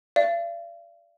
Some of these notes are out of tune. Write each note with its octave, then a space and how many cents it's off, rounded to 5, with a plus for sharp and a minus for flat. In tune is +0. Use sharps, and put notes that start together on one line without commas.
D5 +0 F5 -45